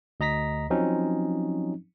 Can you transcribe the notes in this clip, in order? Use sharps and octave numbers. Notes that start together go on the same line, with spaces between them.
D2 D#5 A#5 A#6 B6
F3 F#3 C4 C#4 D#4